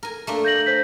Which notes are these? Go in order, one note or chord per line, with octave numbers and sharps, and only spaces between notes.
A#4 G#5
A3 A#3 D4
G6 A#6 F#7
C5 G6 B6